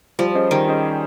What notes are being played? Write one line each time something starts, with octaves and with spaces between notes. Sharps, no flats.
F3 G3
C#4 G#4 C5 D#5
D#3 G3
C#4 G#4 C5 D#5